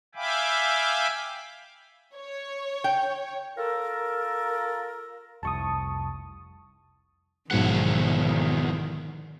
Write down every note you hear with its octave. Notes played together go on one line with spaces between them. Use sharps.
E5 F5 G5 G#5 B5 D6
C#5
G5
F4 A4 A#4
F1 C2 A5 C#6 D#6
B1 E2 G#2 D3 D#3 F3 F#5